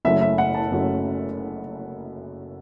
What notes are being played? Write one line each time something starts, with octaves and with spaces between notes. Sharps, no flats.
F#1 F#2 F#3 A3 E5
E5
F#5
A5
F#1 F#2 F#3 A3